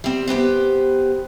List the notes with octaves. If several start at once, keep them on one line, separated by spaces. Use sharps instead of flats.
G3 C4
B3 G4 B4 C5